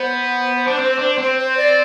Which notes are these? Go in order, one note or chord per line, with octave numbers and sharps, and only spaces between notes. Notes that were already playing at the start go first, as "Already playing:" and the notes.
Already playing: B3 C5
D4
C4
D4
C4
C5
D5